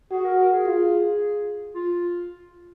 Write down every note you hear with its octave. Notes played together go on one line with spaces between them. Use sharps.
F#4 G#4
A#4
A#4
G#4
F4
F4